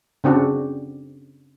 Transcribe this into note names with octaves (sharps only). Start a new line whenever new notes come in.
C#3 C4 D4 F#4